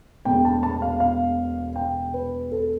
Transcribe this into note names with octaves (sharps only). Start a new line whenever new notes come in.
E1 E2 B2 A3 G5
A5
A5
F5
F5
G5
B4
A4